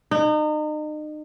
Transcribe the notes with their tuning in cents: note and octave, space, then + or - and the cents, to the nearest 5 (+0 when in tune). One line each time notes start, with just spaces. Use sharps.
D#4 -35